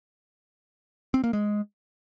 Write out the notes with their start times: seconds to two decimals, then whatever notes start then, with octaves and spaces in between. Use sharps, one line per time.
1.14 C4
1.24 A#3
1.33 G#3